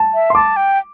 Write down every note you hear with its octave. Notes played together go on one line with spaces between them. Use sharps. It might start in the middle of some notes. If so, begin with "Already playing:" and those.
Already playing: A5
E5
C6
A5 D6
G5